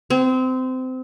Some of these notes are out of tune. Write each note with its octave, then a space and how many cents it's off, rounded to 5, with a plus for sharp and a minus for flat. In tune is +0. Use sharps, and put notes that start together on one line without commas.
C4 -25